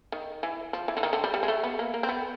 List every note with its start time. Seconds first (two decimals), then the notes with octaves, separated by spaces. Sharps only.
0.12 D#3
0.43 E3
0.73 F3
0.88 E3
0.97 D3
1.03 D#3
1.13 D3
1.24 G3
1.34 G3
1.43 G#3
1.48 A3
1.64 B3
1.79 A#3
1.94 A#3
2.03 C4
2.09 B3